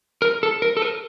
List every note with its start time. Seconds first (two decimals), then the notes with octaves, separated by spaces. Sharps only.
0.22 A#4
0.43 A4
0.62 A#4
0.77 A4
0.82 A#4